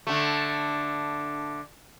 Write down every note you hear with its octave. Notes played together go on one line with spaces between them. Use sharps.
D3 A3